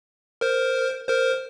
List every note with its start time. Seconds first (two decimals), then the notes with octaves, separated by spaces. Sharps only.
0.41 A#4 C5
1.08 A#4 C5